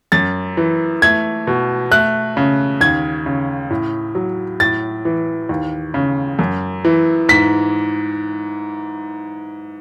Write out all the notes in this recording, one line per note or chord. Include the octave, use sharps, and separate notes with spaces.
F#2 A6
E3
A3 G#6
B2
A3 F#6
C#3
D#2 G#6
C#3
A2
F#3
A2 A6
E3
D#2
C#3
F#2
E3
G#2 B6